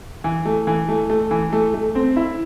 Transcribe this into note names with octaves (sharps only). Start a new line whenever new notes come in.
E3
A3
E3
A3
A3
E3
A3
A3
C4
E4